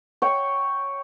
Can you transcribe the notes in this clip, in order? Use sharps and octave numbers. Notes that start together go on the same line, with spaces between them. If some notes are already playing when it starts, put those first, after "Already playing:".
C#5 G5